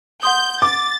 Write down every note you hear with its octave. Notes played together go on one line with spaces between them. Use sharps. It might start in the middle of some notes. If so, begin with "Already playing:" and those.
F#5 C6 D#6 G6
D6 A6